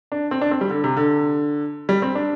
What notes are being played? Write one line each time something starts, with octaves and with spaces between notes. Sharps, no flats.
D4
C4
D4
C4
G3
D3
C3
D3
G3
C4
D4